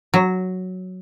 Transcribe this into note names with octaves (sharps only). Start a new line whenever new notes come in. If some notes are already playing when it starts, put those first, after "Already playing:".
F#3